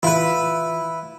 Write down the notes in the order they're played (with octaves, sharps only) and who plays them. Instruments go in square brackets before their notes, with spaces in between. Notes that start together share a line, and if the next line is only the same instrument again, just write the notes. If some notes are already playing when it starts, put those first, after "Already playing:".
[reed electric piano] E3 F4 [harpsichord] E4 B4